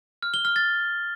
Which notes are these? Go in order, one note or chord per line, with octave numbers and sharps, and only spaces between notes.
F6
G7
F6
A6